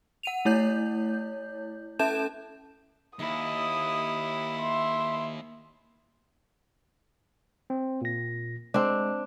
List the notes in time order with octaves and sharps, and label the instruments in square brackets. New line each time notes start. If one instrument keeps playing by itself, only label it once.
[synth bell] F#5 D#7 F7
A3 E4 C#5 G6
C#4 A4 E5 A5 G6 E7
[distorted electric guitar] D#2 [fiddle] E4 [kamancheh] D#6
[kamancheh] E5 C6
[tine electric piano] C4
A#2 A#6
[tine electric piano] G#3 [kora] C4 D4